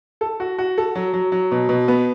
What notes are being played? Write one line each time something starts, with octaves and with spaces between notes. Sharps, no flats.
A4
F#4
F#4
A4
F#3
F#3
F#3
B2
B2
B3